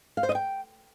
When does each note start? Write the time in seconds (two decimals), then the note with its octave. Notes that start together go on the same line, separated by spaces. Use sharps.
0.17 F5
0.23 C5
0.29 D#5
0.35 G5